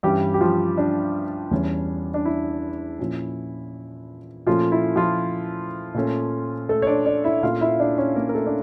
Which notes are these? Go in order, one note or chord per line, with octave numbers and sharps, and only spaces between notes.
G2 E3 G3 C#4 G4
G4
F3 F4
D4
E2 E3 G3 C#4
D4
E4
A#2 F3 C#4
A#2 F3 A3 C#4 F4
E4
F3 F4
A#2 A3 C#4
A3 A4
C#5
D4 D5
D4 D5
E4 E5
A#2 A3 C#4 F4 F5
E4 E5
D4 D5
C#4 C#5
A#3 A#4
A#4
A3 A4
D4